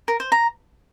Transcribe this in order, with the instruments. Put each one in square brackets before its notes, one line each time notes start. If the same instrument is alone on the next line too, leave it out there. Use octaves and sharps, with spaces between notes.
[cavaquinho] A#4
C5
A#5